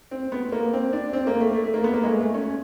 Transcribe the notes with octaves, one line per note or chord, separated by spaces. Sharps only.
C4
B3
A#3
C4
D4
C4
A#3
A3
A3
A3
A#3
B3
A#3
G#3
A3
A3
C#4